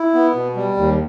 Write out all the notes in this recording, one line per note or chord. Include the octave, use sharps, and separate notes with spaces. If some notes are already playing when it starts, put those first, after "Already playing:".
Already playing: E4
B3
B2
G3
D#2